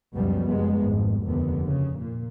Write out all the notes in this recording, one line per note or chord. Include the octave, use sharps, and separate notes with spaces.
C#2 F#2 B2 F3 G3
F#1 G#3 B3
G#1 F2
F1 D#2 D3 B3
C#3
A#2